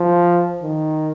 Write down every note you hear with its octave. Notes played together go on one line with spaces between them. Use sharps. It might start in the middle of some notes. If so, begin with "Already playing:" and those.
Already playing: F3
D#3